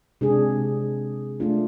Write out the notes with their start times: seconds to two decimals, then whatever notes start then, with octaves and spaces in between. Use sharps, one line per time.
0.21 C3 G#3 D4 G#4
1.40 A3 D4 F4